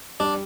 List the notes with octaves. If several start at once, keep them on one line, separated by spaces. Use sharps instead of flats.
G3 D4